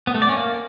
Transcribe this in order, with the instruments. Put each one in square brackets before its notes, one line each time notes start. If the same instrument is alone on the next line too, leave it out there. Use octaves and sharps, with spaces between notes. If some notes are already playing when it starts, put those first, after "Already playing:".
[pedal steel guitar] B3
A3
D5
C#4
A#3